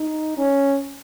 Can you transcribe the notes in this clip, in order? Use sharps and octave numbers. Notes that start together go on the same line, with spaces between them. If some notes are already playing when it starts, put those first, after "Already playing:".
Already playing: D#4
C#4